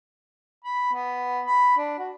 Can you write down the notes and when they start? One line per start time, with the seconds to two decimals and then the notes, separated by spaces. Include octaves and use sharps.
0.65 B5
0.93 B3
1.47 B5
1.78 D4
1.99 F#4